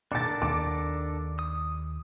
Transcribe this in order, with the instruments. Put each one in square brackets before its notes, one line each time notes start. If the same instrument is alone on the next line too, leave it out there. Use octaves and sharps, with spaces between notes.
[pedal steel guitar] D4 A4 A#4 [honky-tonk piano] D6 A6
[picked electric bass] D#2 [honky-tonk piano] D6
[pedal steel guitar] D#6